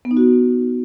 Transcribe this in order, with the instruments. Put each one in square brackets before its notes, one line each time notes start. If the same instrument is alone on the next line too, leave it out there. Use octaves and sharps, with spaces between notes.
[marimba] B3
D#4
F#4